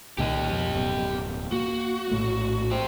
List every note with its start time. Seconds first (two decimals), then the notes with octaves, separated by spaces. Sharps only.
0.18 C2 A#2 D#3 G4 D#5
0.51 F2 B2
0.73 D1 F#2 B2
1.52 A#3 F#4
2.11 A#1 A2 A3
2.71 G4 C5